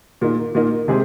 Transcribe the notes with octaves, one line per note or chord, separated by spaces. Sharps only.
A#2 A#3 D#4
A#2 A#3 D#4
C3 G#3 C4 G#4